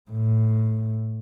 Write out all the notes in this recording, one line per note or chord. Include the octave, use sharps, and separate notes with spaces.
A2